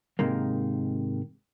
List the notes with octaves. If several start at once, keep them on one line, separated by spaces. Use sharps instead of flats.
G#2 C3 D#3 G#3 A#3